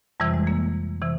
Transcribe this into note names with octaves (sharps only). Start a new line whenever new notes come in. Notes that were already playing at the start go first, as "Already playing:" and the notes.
F2 C3 E3 G3
G#3
A#3
C3 E3